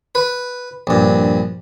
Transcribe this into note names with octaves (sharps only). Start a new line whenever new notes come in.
B4
A#1 G2